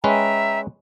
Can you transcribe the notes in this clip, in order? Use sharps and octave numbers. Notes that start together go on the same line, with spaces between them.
G#3 C#4 B4 E5 G5 A#5